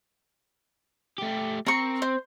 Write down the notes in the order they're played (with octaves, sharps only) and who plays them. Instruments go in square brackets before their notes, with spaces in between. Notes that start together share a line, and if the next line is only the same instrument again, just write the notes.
[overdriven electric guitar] A3 G4
[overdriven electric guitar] C4 [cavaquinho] A#4 C#6
[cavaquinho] C5